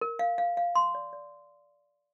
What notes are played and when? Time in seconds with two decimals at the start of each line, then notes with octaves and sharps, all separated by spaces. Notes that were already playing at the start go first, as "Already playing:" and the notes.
0.01 A#4
0.19 F5
0.38 F5
0.57 F5
0.75 C6
0.95 D5
1.13 D5